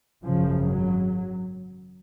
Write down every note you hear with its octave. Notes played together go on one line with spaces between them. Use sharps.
G#1 F#2 C#3 F3
F#3